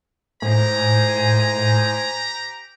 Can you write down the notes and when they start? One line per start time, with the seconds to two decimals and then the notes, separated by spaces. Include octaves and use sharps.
0.42 A2 G4 C5 G#5 A#5